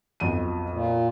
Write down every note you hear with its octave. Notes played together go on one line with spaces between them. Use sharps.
B1 F2 D#7
A#2